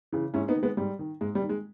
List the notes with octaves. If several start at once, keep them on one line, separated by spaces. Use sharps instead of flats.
C#3 E3
G#2 C#4 E4
B3 D#4
D#3
G#3 B3
G#2 G3
D#3
G#2 G#3
G3
D#3
G#3